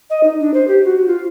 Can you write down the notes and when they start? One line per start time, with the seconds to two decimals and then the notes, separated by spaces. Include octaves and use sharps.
0.10 D#5
0.23 D#4
0.40 D4
0.54 C5
0.68 G4
0.85 F#4
1.07 F4